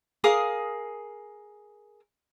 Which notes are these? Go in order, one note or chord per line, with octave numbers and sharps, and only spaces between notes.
G#4 A#4 F5 D#6